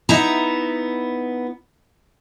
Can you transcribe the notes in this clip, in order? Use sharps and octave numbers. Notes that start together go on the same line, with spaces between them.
B3 D#4 E4 A#5